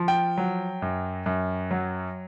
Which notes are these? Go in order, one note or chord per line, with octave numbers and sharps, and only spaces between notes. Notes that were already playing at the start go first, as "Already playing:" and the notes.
Already playing: F3
G5
F#3
F#2
F#2
F#3